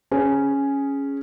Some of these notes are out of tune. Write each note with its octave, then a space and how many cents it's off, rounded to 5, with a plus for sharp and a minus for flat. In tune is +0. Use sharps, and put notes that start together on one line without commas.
C#4 +0 G#4 +0